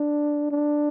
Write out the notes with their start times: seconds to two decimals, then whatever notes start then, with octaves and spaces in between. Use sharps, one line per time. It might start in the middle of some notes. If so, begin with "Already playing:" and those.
Already playing: D4
0.51 D4